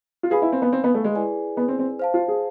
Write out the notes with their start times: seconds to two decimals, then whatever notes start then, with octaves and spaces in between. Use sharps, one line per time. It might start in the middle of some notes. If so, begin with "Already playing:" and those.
0.23 F4
0.30 G#4 B4 F5 G#5 B5
0.42 E4
0.52 C4
0.62 B3
0.72 C4
0.84 B3
0.94 A3
1.04 G#3
1.15 E4 G#4 B4 D5 G#5
1.57 B3
1.68 C4
1.79 C4
1.99 C5 F5 A5
2.14 F4
2.28 G#4